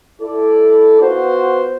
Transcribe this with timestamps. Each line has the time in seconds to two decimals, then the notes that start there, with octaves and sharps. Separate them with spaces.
0.21 E4 A4 D5
1.01 B3 F4 F#4 B4 C5